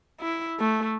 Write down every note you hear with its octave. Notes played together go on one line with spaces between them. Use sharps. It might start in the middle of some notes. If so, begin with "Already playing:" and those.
E4
A3